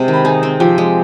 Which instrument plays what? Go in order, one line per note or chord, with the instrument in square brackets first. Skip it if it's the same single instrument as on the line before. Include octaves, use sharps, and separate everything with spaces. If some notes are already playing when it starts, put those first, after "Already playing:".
Already playing: [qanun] C3 G#3
D#3
[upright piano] B5
[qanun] D#4 [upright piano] G#4 G#5
[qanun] C4
[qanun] F3 [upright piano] G4 G5
[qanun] G#3